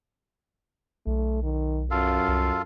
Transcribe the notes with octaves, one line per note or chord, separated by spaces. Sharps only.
B1 A3
D#3
F#2 F4 A4 F5
C2